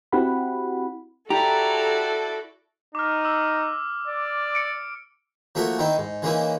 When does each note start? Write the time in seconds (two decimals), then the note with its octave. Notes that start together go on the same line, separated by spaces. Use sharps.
0.12 C4 E4 F#4 G4 F#5 B5
1.30 E4 F#4 G4 A4 D5 A#5
2.95 D#4 D6 F6
3.25 D6 E6
4.07 D5
4.55 C#7 D7
5.55 F3 A3 A#3 F#4 E5 F#5
5.79 D#3 C4 D#4 E4
5.98 G#2
6.22 E3 G#3 A#3 C#4 D#4 E4